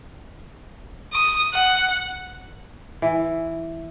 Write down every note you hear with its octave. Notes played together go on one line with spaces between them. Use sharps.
D#6
F#5
E3